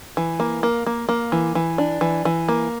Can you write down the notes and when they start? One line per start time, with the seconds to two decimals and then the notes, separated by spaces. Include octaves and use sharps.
0.17 E3
0.40 A#3
0.63 A#3
0.86 A#3
1.09 A#3
1.32 E3
1.55 E3
1.78 D4
2.01 E3
2.25 E3
2.48 A#3